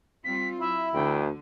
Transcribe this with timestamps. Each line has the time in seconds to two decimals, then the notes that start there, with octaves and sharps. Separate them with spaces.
0.24 G3 C4 F4 B6
0.60 F#3 E4 E5
0.94 D2 D3 G5